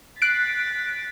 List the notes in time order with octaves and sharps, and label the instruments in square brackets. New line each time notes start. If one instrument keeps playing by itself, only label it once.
[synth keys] F#6 C7 D7 [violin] A6 B6